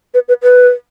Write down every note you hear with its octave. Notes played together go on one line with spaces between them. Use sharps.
B4
B4
B4